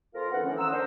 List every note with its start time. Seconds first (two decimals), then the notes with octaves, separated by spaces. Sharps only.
0.14 F2 F4 A#4 F5
0.31 E3 B3 D4 A4 F#5
0.43 A2 D#3 F3 C#4
0.57 F#5 A#5 C6 D#6 E6
0.72 D4 A#4 C5 F#5